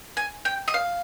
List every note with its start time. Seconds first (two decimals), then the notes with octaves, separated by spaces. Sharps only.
0.17 G#5
0.45 G5
0.68 D#5
0.74 F5